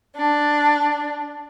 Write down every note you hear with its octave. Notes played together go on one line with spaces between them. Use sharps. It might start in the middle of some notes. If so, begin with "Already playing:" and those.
D4